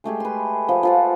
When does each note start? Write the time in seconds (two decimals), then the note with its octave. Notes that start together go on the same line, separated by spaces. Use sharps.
0.04 G#3 A3 G4 G#4
0.20 B4 C6
0.69 F3
0.83 F3 F4 F#5